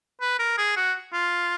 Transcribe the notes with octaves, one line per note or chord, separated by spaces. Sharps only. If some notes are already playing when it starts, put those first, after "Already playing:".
B4
A#4
G#4
F#4
F4